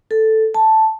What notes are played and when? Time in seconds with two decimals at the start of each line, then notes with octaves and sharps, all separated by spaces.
0.11 A4
0.55 A5